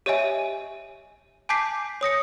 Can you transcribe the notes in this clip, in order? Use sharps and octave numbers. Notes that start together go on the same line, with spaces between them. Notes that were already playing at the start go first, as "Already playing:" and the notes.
G4 C#5 D#5 E5 G#5
G#5 A5 D6 G6 B6 C7
C#5 D#6 A#6 C#7